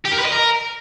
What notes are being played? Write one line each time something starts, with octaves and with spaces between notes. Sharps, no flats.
G4
A#4
B4
D#5
A#4